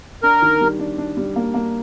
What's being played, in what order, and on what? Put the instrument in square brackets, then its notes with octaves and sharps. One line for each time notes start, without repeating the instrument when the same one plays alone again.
[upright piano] D4 [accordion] A#4
[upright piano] D#3
G3
D4
D4
G3
A#3
A#3